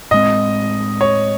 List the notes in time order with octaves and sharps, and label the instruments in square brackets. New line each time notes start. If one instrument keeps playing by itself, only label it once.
[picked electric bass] A2 G#3 C4 [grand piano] D#5
[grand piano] C#5